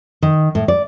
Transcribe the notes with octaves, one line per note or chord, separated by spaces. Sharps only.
D#3
A2
D5